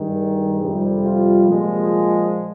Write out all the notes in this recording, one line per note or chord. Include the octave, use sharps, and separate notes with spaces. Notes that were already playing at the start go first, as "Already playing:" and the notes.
Already playing: G2 D#3 G#3
F2 C3 G3
F4
A#2 F3 G#3